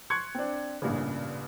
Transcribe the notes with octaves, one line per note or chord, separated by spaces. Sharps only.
C6 C#6 F#6 G#6 C#7
C4 D4
A1 G2 A#2 C#3